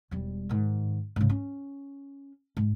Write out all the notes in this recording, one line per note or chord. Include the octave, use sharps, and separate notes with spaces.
E1 G3
G#2 D#3
G#2 C#3
C#4
G#2